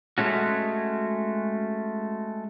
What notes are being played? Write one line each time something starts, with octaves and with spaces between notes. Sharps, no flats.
G#3 A3 C#4 F#4